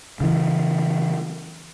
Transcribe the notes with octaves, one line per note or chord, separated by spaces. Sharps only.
C#3 E3